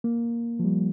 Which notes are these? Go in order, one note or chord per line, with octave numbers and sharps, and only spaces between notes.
A#3
F3
G3